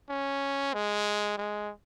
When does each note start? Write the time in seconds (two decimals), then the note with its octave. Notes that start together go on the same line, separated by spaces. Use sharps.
0.09 C#4
0.74 G#3
1.38 G#3